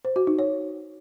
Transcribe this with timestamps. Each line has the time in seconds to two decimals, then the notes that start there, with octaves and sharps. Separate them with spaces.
0.05 C5
0.16 F#4
0.27 D#4
0.39 C#5